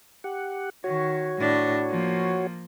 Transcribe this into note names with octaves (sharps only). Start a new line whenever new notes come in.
G4 F#5
D#3 F#4 C#5
A2 D4
F3 A#3